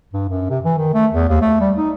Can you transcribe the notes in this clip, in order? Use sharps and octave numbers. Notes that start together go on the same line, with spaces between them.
G2
F#2
C3
E3
D#3
A3
E2
D#2
A3
G3
D#4